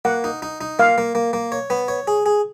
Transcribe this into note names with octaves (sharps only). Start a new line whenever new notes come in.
A#3 F#5
D#4
D#4
D#4
A#3 F5
A#3
A#3
A#3
C#5
B3
C#5
G#4
G#4